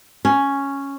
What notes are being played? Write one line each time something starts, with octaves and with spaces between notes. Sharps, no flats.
C#4